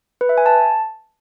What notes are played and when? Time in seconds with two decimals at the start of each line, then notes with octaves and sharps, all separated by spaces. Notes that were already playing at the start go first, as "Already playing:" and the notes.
0.21 B4
0.29 E5
0.38 G#5
0.46 A5